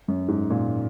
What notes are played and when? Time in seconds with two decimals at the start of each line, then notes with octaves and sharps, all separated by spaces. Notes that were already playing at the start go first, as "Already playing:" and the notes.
0.08 F#2
0.28 G#2
0.50 A#2